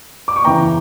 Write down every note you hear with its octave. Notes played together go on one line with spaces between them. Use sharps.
D6
C#6
E2 C#3 E3 G5 A#5